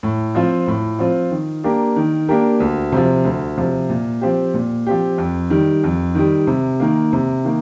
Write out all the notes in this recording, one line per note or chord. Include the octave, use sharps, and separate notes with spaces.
A2
F3 C4 F4
A2
F3 C4 F4
D#3
A#3 D4 G4 A#4
D#3
A#3 D4 G4 A#4
D2
C3 F3
D2
C3 F3
A#2
F3 C4 G4
A#2
F3 C4 G4
F2
D#3 G3
F2
D#3 G3
C3
D#3 A#3
C3
D#3 A#3